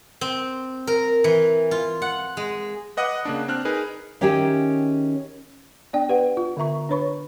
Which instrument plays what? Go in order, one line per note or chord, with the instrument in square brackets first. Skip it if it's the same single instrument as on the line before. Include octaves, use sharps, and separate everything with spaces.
[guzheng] C4
A#4
E3
F4
F#5
G#3
[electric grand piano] B4 D#5 F#5 D6 D#6 F#6
C#3 A#3 D4
C4 D4 F6 F#6
D#4 G#4 A#4 B4
[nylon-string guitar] D#3 C#4 D#4 G4 G#4 E5
[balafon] B3 D4 D5 G5
G4 B4 D5 F#5
F4
D3 B3 E5 A#5 C#6
D4 B4 C#5 B5 C#6